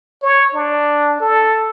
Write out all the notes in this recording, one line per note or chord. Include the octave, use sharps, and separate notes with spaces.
C#5
D4
A4